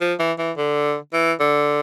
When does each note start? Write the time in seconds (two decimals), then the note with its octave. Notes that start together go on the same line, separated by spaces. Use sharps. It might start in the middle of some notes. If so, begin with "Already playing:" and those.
0.01 F3
0.19 E3
0.39 E3
0.57 D3
1.13 E3
1.40 D3